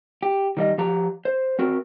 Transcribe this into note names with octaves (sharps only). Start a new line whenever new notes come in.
G4
D#3 G3 D#5
F3 G4 A#5
C5
C4 F#4 A#4